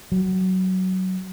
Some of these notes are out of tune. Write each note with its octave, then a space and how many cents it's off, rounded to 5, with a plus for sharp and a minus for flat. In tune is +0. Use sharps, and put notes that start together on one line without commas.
F#3 +15